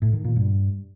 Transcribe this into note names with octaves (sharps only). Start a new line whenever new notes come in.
A2
D#3
A#2
G2